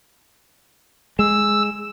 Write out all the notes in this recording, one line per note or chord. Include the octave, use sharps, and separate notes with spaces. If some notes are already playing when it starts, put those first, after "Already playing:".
G#3 E6